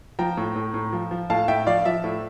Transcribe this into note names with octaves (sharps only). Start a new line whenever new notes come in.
F3 G5 A#5
A2
A2
A2
F3
F3
A2 F5 A5
A2 E5 G5
F3 D5 F5
F3 E5
A2